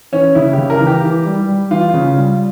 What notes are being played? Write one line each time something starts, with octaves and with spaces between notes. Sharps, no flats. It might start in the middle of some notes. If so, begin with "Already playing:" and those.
E3 C#4
C#3 E4
G4
C#3
A#4
E3
G4
E3
G3
G3
E3 F4
C#3
G3